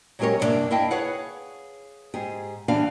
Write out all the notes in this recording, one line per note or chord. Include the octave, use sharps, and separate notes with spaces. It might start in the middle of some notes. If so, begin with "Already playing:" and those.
F#3 G#3 C#4 G4 A#4 C#5
G2 C3 F3 A#3 D4 E5
E4 D#5 F5 G5 A5
G#4 B4 C#5 F5 F#5
G#2 G4 G#4
D3 E3 G3 B3 D4 F5